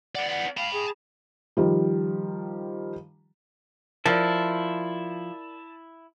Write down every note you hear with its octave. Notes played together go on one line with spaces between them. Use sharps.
B3 D5 F#5
F#5
F5 A5 B5
G#4
D#3 F3 G3
F3 E4 A#4 D5 A5